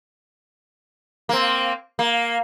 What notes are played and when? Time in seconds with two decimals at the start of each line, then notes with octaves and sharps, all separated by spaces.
1.29 A#3 C4
1.99 A#3